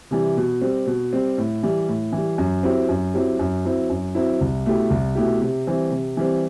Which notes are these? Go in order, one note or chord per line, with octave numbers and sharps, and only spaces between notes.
C3 E3 G3
B2
G3 C4
B2
G3 C4
A2
E3 G3
A2
E3 G3
F#2
F#3 C4 E4 G4
F#2
F#3 C4 E4 G4
F#2
F#3 C4 E4
F#2
F#3 C4 E4
C2
B2 A3 E4 G4
C2
B2 A3 E4 G4
C3
E3 G3 C4
C3
E3 G3 C4